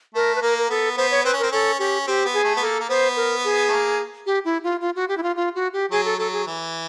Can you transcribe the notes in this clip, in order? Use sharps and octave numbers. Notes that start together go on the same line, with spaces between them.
A3 A#4
B4
A#3 A#4
A#4
B3 A4
B3 C5
C#5
C4 B4
C#4
C4 A#4
C#4 A4
C#4 G4
C4 G4
B3
G#4
A3
B3
A#3 A4
A#3
B3 C5
A#4
G#4
A3
A#3
G4
E4
F4
F4
F#4
G4
E4
F4
F4
F#4
G4
F#3 G#4
A4
F#3 A4
G#4
E3